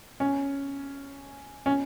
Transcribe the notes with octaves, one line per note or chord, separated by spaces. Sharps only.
C#4
C#4